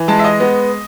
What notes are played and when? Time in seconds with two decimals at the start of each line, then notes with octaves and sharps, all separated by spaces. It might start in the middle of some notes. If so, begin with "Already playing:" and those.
Already playing: E3
0.08 G#3 A5
0.19 E5
0.24 D#5
0.40 B3